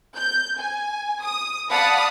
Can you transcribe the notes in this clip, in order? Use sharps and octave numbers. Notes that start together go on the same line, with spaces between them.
G6
G#5
D#6
D5 F5 F#5 A5 B5 D#6